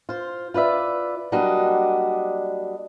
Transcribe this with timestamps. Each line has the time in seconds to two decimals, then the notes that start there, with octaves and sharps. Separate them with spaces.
0.09 F4 C5
0.54 F4 B4 D5 E5
1.32 F#3 G3 A#3 D4 F#4 D#5